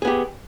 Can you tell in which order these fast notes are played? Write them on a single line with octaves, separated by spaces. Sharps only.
G#4 B3 G4